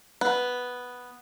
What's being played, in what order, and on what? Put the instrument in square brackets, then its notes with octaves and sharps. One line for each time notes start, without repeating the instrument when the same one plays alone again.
[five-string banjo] B3